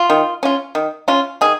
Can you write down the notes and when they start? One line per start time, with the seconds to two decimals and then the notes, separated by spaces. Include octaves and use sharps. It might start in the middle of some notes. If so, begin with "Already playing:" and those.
Already playing: F4
0.10 D#3
0.43 C#4 F4
0.75 D#3
1.08 C#4 F4
1.41 D#3 G#4